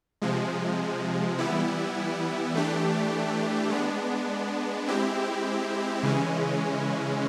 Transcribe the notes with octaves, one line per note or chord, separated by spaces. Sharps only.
C3 F3 G#3
E3 G3 B3 E4
E3 A3 D4 G4
G#3 B3 D4
G#3 C4 E4 G4
C#3 E3 G#3 C#4